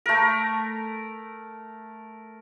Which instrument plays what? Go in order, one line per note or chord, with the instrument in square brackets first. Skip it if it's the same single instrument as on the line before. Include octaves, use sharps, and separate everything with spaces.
[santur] A3 A#4